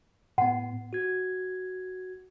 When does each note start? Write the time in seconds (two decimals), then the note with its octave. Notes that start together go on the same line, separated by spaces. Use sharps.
0.38 A2 B3 F#5
0.93 F#4 G#6